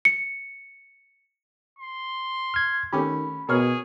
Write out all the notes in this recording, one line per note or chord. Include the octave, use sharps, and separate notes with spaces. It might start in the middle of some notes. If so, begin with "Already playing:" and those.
C#7
C6
F6 G#6
D#3 A3 C#4 G4 B5
B2 G#4 A#4 C#5 F6